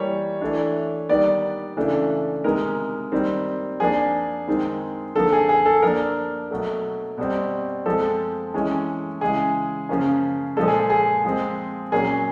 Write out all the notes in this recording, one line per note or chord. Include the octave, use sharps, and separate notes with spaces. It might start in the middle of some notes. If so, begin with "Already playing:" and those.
Already playing: E3 G3 A#3 C#5
E3 A3 D4
D#3 G3 B3 D5
C#3 E3 A3 D4
C3 D#3 G#3 B3 A#4
D#3 G3 C4
F3 A#3 D4 G#4
D#3 G#3 C4
D3 F3 A#3 A4
G#4
G#4
A4
F3 A#3 D4 A#4
B2 F#3 A3
B2 G3 C4
F3 G#3 C4 A4
E3 G#3 C#4
C#3 E3 G#3 G#4
C#3 F3 A#3 C#4
A#2 F3 G#3 A4
G#4
G#4
F3 G#3 C4
A#2 F#3 A#3 C#4 G#4